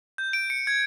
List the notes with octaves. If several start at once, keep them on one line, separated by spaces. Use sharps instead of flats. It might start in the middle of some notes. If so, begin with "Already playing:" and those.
G6
D7
C#7
G#6